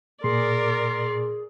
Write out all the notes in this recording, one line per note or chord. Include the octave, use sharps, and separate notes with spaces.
A#2 G#4 A#4 D5 C6